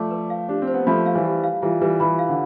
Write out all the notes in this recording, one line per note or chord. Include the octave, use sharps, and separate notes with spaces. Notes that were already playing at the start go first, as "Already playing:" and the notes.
Already playing: F3 A3 D5 A5 D6
B4
F5
D4 G4
C4
C5
B3
F3 A3 B5
F5
E3 G3
G4
F5
E3 G3 F4
E3 G3 B4
E3 B5
F5
D3